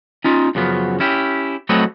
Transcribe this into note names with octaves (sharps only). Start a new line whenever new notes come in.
C#4 D#4 F4
F#2 C#3 F3 B3
C#4 E4 G4
F#3 A3 C4 B4 C#5 D#5